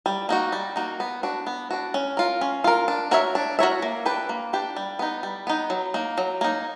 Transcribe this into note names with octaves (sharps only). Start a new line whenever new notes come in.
G3
A#3 D#4 F#4
G3
A#3 D#4 F#4
B3
D4 F#4
B3
D4 F#4
C#4
F4 A#4
C#4
F4 A#4
D4
F#4 A#4 C#5 E5
D4
F#4 A#4 C#5 E5
A#3
D4 G4 B4
A#3
D4 G4 B4
G3
B3 D#4
G3
B3 D#4
F#3
A#3 D#4
F#3
A#3 D#4